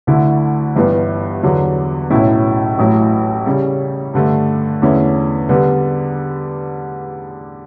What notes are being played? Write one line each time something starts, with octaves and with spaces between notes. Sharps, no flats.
D2 D3 A3 E4
G1 G2 E3 G3 B3
E2 D3 F#3
B1 A2 F#3 C#4 E4
A1 A2 F#3 A3 E4
C#3 G3 C#4
G2 D3 A3
E2 D3 A3 C#4 E4
D3 G3 B3